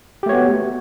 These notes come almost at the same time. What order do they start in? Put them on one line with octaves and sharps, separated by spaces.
G4 A3 C#5 B3 F#4